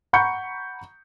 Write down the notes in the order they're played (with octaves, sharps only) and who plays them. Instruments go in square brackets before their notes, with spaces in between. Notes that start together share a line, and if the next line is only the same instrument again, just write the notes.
[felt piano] F#5 A#5 B5 C#6 G6 C#7